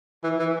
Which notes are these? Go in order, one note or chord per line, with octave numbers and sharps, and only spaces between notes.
E3
E3